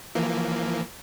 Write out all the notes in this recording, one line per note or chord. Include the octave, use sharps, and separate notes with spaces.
E3 F3 A#3